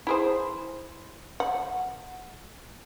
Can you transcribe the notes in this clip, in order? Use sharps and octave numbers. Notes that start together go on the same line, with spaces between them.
E4 G#4 C5
F#5